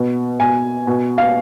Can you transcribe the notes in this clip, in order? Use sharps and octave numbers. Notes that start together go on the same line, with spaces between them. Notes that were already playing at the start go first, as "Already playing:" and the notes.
Already playing: B2
B2 G#5
B2
F5